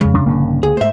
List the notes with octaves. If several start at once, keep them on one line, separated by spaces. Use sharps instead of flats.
F2 C#3 G#3
C3 D4
A#1 G2 D3 D#3 A#3
C#2 G#4
G#2 A3 C5 E5